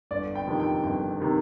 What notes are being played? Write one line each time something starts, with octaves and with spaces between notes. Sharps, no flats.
G1 D5
G5
F2 C3 D#3
G5
G1 G5
C3 D#3